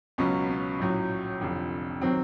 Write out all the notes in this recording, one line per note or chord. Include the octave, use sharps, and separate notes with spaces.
C#2 B2 F#3 C#4
C#4
A#1 A2 F#3
F1 F2 D3
D#3 F#3 C4